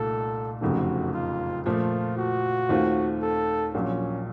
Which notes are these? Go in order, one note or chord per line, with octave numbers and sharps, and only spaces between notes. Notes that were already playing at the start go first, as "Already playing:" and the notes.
Already playing: C2 A#2 A3 D#4 A4
F#1 F2 C3 D#3 A3 F#4
F4
A#2 F3 A3 F4
F#4
D#2 D#3 A3 C4 F4
A4
A#1 A#2 F#3 C#4